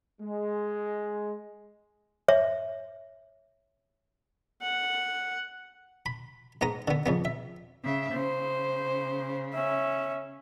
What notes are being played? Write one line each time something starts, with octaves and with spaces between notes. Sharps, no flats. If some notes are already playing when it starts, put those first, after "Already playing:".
G#3
C#5 E5
F#5
B5
G#2 B3 A#5 D#6
D3 B3
F2 C#3 B3
E5
C#3 E5
C#3 C5
C#4 E5